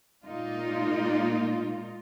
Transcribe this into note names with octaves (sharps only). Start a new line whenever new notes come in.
A#2 G#3 A#3 D#4 F4